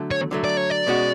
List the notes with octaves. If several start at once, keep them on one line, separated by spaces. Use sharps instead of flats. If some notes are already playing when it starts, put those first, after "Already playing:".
Already playing: D3 F#3 A3
C#5
D3 F#3 A3
D5
C#5
D5
B2 G#3 C#4 F#4